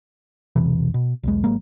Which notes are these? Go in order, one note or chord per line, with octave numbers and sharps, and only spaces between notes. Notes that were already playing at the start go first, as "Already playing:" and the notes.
E1 B1 C3 E3
B2
B1 E2 G#3
G#1 F#3 G#3 A#3